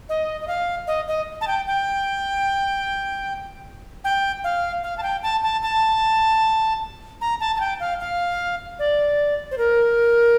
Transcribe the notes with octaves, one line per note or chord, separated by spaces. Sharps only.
D#5
D#5
F5
D#5
D#5
A5
G5
G5
G5
F5
F5
A5
G5
A5
A5
A5
A#5
A5
A5
G5
F5
F5
D5
C5
A#4